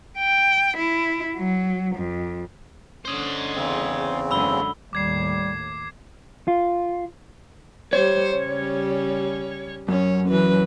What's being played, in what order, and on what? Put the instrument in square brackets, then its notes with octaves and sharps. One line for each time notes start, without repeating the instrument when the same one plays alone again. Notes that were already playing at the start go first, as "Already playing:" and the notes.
[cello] G5
E4
F#3
F2
[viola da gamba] D3 C#4 [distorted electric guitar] C5 D#5
[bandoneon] E2 C#3 C4
[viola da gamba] F#2 D3 G#3 [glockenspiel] B5 E6 G7
[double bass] D#2 A2 [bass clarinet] G3 [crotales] D6 G#6 C7
[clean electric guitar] F4
[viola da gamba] G3 C5 [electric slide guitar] C#5
[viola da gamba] C#3 G3 C#4
[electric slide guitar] F#2 [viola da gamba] C#4 C#5
[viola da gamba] E3 F#3 B4